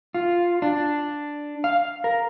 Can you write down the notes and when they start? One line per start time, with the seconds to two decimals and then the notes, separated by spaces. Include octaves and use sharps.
0.14 F4
0.62 D4
1.64 F5
2.04 A#4